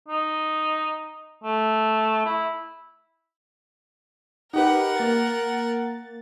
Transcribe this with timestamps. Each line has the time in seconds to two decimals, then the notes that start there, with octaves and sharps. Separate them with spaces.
0.08 D#4
1.44 A3
2.25 E4
4.53 D#4 G4 A#4 B4 F#5
4.97 A#3 A6